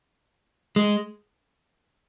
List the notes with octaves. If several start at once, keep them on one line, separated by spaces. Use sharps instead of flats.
G#3